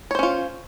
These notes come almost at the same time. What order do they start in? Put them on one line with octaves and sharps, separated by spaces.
C#5 C5 C#4 F4